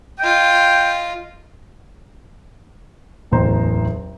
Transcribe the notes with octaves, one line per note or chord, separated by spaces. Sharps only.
F4 D#5 G5
D1 A1 E2 C5 A#5